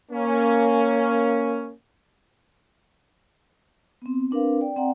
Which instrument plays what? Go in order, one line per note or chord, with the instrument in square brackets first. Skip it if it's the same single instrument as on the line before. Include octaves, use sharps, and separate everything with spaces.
[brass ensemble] A#3 C#4
[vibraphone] B3 C4
C4 D4 A#4 B4 F5
D5 G5
C4 D5 F#5 G5 A#5